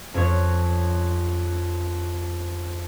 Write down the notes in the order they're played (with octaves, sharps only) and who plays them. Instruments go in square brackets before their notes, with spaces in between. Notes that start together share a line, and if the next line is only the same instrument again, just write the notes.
[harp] F2 C#4 C#5